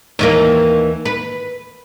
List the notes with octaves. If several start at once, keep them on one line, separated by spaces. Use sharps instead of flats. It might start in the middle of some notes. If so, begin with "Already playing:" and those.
D#2 E3 A#3
B4